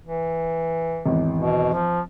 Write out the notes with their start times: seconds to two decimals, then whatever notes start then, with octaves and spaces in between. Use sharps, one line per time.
0.05 E3
1.06 G#1 E2
1.38 B2
1.74 F3